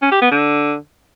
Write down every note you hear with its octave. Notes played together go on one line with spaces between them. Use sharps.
C#4
G4
B3
D3